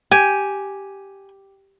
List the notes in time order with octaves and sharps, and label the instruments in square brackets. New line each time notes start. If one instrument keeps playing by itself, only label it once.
[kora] G4 [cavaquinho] G#5